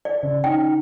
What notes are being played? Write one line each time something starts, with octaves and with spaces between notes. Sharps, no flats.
D5
C#3
C#4 D#4 G5